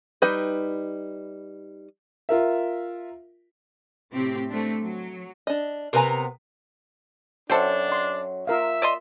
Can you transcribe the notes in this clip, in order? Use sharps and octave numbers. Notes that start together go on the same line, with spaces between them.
G3 D#4 B4
F4 A#4 E5
A2 C3 C4 G4
A3 C4 D4
F#3
D4 D#5
C3 B3 A#4 B4 G#5 A#5
F#2 F#3 D4 A4 C5 G5
D#5 C6
F4 A#4 E5 F5
D5 D#5 C6